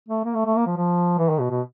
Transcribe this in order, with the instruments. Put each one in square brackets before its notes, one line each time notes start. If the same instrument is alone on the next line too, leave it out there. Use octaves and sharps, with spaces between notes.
[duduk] A3
A#3
A3
A3
A#3
F3
F3
E3
D#3
B2
B2